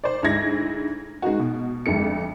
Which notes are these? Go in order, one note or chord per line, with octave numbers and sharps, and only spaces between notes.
C5 D5
D2 G#2 D#4 E4 G#6 A#6
G#3 D#4 F#4
B2
G1 F2 G#3 C#7